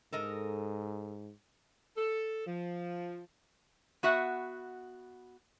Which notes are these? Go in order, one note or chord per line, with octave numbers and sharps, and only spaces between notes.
G#2 A4 A#4 D#5
A4
F3
B3 F#4 E5 F#5